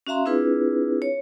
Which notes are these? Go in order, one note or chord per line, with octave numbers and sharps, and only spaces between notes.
C#4 F#4 E5 F5 A#5 C6
C4 D4 E4 F4 G#4 B4
C#5